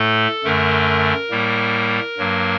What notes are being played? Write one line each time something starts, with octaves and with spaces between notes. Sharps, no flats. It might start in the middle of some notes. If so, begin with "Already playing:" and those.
Already playing: A2 A3 A4
F#2 D3 A3 A#4
A2 G3 A#3
G2 F#3 A#3